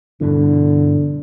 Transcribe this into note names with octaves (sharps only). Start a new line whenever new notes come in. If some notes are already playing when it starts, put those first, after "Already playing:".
G2 B2 D3 E3